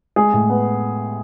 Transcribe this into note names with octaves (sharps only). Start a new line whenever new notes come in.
G#3 G#4
A2
B3